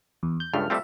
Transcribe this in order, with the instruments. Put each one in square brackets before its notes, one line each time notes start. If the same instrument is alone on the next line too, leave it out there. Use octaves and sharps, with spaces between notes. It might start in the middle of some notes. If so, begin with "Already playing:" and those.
[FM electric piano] E2
G6
[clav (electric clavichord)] C#2 G2 A3 [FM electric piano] F6
[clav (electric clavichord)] G3 A3 C4 [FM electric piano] F4 E5